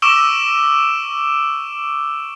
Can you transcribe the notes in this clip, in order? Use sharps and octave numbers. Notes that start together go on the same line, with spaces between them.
C#6 D6 E6 D7 E7 G7